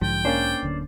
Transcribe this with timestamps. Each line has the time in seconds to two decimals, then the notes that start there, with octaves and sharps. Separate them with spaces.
0.01 B1 G#2 D3 F3 G5
0.25 A#3 C#4 D4 C5 D5
0.63 D1 D3